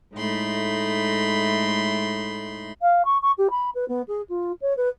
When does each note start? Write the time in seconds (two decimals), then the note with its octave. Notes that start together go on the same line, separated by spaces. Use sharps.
0.14 A2 G#3 A3 D#4 B5 C6
2.82 F5
3.05 C#6
3.22 C#6
3.38 G4
3.51 B5
3.75 B4
3.89 B3
4.08 G#4
4.30 F4
4.62 C#5
4.77 B4